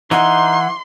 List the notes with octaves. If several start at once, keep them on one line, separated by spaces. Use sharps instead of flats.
E3 D#4 F#5 C6